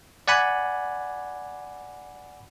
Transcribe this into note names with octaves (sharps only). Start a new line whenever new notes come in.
D5 F#5 G#5 B5